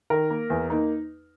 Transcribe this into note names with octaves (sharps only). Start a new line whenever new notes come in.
D#3 A#4
A#3
E2
A#3 D#4